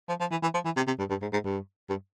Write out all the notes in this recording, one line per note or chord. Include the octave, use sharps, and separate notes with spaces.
F3
F3
E3
E3
F3
E3
C3
C3
G2
G2
G#2
G#2
G2
G2